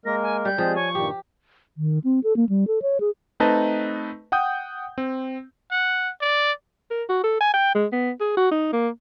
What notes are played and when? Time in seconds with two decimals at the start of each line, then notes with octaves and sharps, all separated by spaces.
0.05 G#3 A#3 A#4 A#6
0.22 G#5
0.45 G3 G6
0.58 F3 G#3 C4 G#4
0.76 C#5 G#5 C#6
0.95 G2 A#2 D#3 G4
1.77 D#3
2.04 C4
2.23 A4
2.36 A#3
2.49 G3
2.67 A4
2.82 C#5
3.00 G#4
3.40 A3 C4 D#4 B4 D#5 A5
4.32 F#5 G5 D#6 G6
4.98 C4
5.72 F#5
6.21 D5
6.91 A#4
7.09 F#4
7.24 A4
7.41 G#5
7.54 G5
7.75 G#3
7.92 B3
8.21 G#4
8.37 F#4
8.51 D#4
8.73 A#3